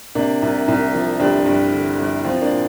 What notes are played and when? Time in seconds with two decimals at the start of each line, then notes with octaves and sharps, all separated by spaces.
0.15 C3 A#3 D4
0.42 C2
0.68 C2
0.94 F3
1.20 G1 D4 G4
1.46 G2
1.72 D3
1.98 G1
2.24 F3 C4 F4
2.42 A#3 D4
2.50 A#2